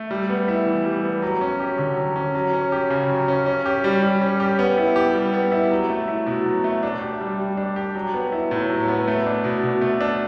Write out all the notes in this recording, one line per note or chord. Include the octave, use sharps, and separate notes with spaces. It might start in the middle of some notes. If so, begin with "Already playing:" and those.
Already playing: A3
G3
B3
E4
E3
G3
B3
F#3
C#4
G4
D3
F#3
C#4
F#3
C#4
G4
C#3
F#3
C#4
C#4
G4
G3
G3
C#4
G4
B3
E4
G4
G3
B3
E4
F#3
A3
E4
B2
F#3
A3
D4
G4
G3
G3
D4
G4
F#3
B3
E4
A2
F#3
B3
A3
D4
B2
B2
A3
D4